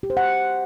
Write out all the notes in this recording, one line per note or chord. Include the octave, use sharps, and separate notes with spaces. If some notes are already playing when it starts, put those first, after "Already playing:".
G4
C5
F#5